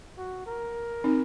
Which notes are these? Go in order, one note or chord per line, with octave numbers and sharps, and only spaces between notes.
F#4
A#4
C4 D#4